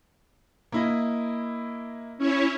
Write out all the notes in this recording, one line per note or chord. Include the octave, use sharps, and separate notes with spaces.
A#3 E4 D#5
C#4 E4 C#5